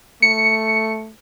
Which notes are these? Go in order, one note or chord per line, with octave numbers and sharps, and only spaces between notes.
A3 C#7